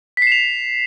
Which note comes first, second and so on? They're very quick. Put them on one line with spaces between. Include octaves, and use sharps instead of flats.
B6 C7 E7 F7